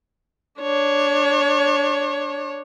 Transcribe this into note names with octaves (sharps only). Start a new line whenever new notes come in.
D4 C#5